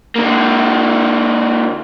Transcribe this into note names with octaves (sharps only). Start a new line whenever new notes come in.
D3 A#3